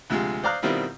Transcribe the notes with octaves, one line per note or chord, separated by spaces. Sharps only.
D2 C3 F3 G#3
C5 D5 F5 A#5 D#6 F#6
B2 D#3 G3 C4 E4 F4